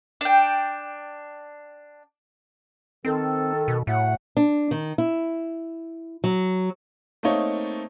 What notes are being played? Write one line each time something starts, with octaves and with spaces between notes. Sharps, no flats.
D4 G5
D#3 C4 A4
B2
A2 F#3 A3 F#5
D4
D#3
E4
F#3
A3 A#3 C4 D#4 C#5